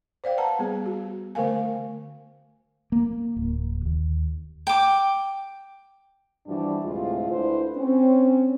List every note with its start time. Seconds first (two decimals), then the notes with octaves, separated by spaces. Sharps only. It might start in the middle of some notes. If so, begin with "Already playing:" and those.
0.24 C5 D5 F5 G5
0.37 B4 F#5 A5 A#5
0.59 G3 B3 G#4
0.86 F#4
1.35 D3 A3 A#4 F5 G#5
2.92 A#3
3.36 D1
3.85 D#2
4.67 G5 D6
6.47 G2 E3 F3 G3 D4 F#4
6.85 D2 A2 C3 G#3 F4
7.31 D2 D3 E4 B4 C5
7.77 C4 C#4